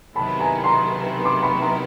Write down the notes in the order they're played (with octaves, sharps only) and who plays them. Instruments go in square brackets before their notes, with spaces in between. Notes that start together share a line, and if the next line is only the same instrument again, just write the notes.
[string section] C3 D#3 F#3 B3 E4 [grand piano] A5 B5
[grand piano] G#5 A#5
A#5 C6
C6 D6
B5 C#6
A#5 C6